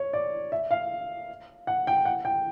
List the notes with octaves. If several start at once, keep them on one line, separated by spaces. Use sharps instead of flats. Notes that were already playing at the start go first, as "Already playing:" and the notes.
Already playing: C#5
D5
E5
F5
F#5
G5
F#5
G5